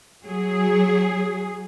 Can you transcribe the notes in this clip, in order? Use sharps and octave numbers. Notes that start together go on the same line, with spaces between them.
F#3 G#4